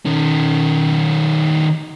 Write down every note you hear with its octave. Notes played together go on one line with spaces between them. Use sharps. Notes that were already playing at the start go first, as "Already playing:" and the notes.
D#3 C#4